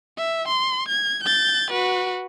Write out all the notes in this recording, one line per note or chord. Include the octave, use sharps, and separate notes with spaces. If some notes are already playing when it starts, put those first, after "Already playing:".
E5
C6
G#6
G6 A6
F#4 B4